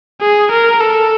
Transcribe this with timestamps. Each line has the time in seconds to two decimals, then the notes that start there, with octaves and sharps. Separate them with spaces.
0.21 G#4
0.52 A#4
0.81 A4